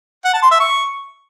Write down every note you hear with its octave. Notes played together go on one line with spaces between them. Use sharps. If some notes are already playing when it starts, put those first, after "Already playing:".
F#5
A5
C6
E5
C#6